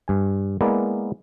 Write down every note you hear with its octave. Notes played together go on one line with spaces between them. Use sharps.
G2 G#5
G#3 A#3 B3 E4 A#4 D5